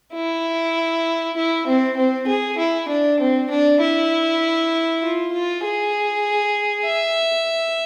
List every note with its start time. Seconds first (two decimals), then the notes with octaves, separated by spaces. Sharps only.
0.14 E4
1.37 E4
1.67 C4
1.97 C4
2.27 G#4
2.58 E4
2.89 D4
3.20 C4
3.50 D4
3.80 E4
5.03 F4
5.33 F4
5.64 G#4
6.86 E5